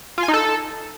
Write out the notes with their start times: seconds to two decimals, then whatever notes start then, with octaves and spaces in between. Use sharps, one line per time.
0.18 F4
0.23 G#5
0.28 D#4
0.34 A4